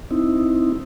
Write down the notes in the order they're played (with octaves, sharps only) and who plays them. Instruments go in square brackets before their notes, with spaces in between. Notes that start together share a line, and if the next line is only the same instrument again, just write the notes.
[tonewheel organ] C4 D#4 E4